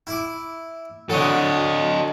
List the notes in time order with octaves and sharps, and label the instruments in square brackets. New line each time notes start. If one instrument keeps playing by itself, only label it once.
[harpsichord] E4 D6
[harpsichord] D3 F#3 [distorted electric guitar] A4 D#5